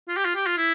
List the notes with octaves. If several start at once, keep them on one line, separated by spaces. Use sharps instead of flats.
F4
G4
F4
G4
F4
E4